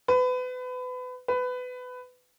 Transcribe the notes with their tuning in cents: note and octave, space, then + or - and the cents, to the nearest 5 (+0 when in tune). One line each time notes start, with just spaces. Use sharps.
B4 +30
B4 +20